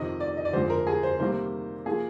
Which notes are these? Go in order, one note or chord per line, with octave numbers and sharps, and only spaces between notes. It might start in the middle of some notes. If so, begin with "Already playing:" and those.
Already playing: F2 C3 D#3 D#5
D5
D#5
D5
F2 D3 G#3 C5
A#4
G#4
C5
C3 D#3 G3 A#3 C5
F3 A#3 G#4